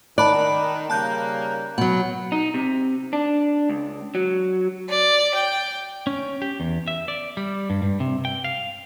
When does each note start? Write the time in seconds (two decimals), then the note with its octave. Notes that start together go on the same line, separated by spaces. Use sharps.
0.18 D#3 D5 A5 B5 F#6
0.90 C#3 G3 A#3 A5 F#6 G6
1.78 B2 F#3 F#5
2.32 D#4
2.54 C3
3.13 D4
3.70 C#2
4.15 F#3
4.88 D5
5.34 G5
6.07 C#4
6.42 G4
6.60 E2
6.88 E5
7.08 D5
7.37 G3
7.70 G2
7.82 G2
8.00 C3
8.25 G5
8.44 F5